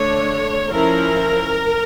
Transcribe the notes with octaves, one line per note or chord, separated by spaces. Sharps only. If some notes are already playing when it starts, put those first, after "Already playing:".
Already playing: D3 A3 D4 C#5
F3 C#4 E4 A#4